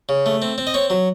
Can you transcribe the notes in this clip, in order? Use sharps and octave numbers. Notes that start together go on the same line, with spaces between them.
C#3
A3
C4
C4
D#5
C4 C#5
F#3